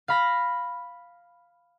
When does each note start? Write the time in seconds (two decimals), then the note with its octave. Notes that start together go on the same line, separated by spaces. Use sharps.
0.08 F5 B5 A#6